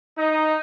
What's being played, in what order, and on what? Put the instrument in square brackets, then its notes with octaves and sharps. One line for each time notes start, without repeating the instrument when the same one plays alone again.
[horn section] D#4